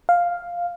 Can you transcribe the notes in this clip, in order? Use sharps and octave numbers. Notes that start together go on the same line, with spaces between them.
F5